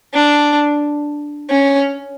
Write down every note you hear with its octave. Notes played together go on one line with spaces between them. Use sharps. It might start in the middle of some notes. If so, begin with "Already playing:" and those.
D4
C#4